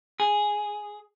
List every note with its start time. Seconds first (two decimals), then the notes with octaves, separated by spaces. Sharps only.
0.20 G#4